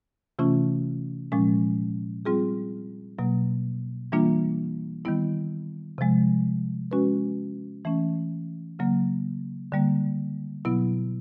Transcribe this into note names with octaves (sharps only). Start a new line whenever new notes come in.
C3 E3 A3 C#4 F4
A#2 F3 G#3 C#4
G3 C4 F4 G#4
B2 F#3 A#3
E3 G3 A#3 D4 F4
D#3 G3 B3 E4
C3 F3 G#3
G#3 C#4 F#4 B4
E3 A3 C#4
C#3 F#3 A#3
D3 G3 A#3
B2 F#3 B3 E4